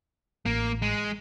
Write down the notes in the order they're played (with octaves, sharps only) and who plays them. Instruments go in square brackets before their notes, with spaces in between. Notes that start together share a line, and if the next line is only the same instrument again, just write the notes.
[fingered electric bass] A1 [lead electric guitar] A#3
[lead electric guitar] G#3